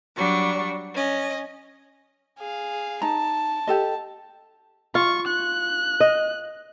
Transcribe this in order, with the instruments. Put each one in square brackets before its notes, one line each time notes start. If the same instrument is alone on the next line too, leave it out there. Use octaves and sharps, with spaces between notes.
[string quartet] F#3 G3 D4 C#6
C#4 D#5
[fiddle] G#4 F5
[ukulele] D#4 A#5 [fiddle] A5
[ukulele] G4 A4 D#5
[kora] F4 [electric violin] C#6
[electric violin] F#6
[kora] D#5